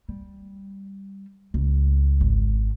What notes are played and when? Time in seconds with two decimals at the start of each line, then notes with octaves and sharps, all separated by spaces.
0.09 G3
1.54 C#2
2.21 G#1